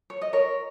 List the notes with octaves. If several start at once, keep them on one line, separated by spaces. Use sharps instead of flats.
C#5
D#5
A#4 C#5